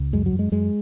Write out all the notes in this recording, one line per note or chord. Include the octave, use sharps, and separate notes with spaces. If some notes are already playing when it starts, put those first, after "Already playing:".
Already playing: C#2
F#2 G#3
F#3
F#2
G#3
F#2 G#3